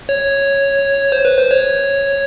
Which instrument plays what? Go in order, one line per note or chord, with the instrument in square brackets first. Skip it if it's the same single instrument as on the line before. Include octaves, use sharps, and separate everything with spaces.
[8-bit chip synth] C#5
C5
B4
C5
C#5